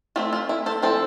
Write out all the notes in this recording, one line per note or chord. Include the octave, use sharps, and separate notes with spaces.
A3 C4 E4 F4
F4
E4
A4 C5
F3 C4 E4 A4 C5